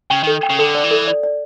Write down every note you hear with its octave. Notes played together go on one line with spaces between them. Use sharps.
C#3 G5
D#3 A4
G5
C#3
D3 A4
D5
E3
A4
D5
D5